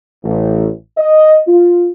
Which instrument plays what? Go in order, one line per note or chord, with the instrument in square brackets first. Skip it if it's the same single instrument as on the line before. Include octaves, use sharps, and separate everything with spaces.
[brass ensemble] A1
D#5
F4